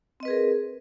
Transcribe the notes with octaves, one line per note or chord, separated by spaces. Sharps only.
C4 G#4 A#4 B4 D#5